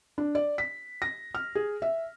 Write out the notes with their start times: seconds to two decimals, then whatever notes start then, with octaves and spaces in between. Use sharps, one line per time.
0.18 D4
0.35 D5
0.58 B6
1.02 A#6
1.35 F6
1.55 G#4
1.82 E5